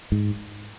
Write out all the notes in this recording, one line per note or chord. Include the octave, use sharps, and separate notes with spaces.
G#2